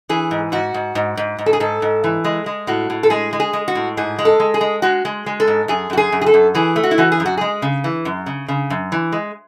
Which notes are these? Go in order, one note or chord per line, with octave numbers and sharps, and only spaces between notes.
E3 G#4
G#2
G#2 F#4
G#2
G#2
G#2
G#2
A4
G#4
G#2 A4
G#2
E3
G#3
G#3
A2 F#4
A2
A4
G#3 G#4
G#3
G#4
G#3
F#4
A2
G#2 G#4
G#3
A4
G#3
G#4
G#3
G#3 F#4
G#3
G#3
A4
G#2
F#2 G#4
F#2 F#4
G#4
F#2
G#4
A4
F#2
E3 G#4
A3
F#4
E4
E3 F#4
G#4
F#2
F#4
G#3 G#4
C#3
E3
F#2
C#3
C#3
F#2
E3
G#3